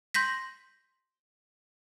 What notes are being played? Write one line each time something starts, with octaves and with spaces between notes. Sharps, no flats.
C6 G6 A#6 B6